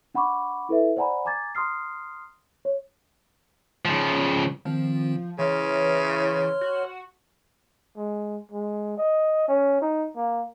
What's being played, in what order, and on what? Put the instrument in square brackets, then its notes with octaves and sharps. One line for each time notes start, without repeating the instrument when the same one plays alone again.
[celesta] D4 F#5 B5 C#6 D6
E4 A4 B4 E5
C5 D5 F#5 G#5 A#5 B5
G#5 A#5 D6 G#6 A6
A#5 C6 D#6 F6 C7
C#5
[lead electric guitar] C#3 F3
[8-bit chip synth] D#3 C4 [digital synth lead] F3
[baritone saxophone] C#3 [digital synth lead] E3 [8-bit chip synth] C#5 C6 F6
[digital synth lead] F#4
[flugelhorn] G#3
G#3
D#5
C#4
D#4
A#3